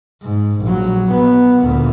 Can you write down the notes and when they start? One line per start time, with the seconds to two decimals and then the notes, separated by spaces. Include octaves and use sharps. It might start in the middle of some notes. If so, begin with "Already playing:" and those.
0.23 G#2
0.63 A#1 F#3
1.08 B3
1.61 D2 A#2